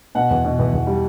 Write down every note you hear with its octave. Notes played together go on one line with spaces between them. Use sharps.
B2 F#5
E2
B2
E2
E2
G3